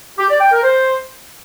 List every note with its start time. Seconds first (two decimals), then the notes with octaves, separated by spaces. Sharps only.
0.18 G4
0.29 D5
0.41 G5
0.52 A#4
0.63 C5